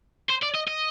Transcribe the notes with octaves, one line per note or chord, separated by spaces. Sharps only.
C5
D5
D#5
D#5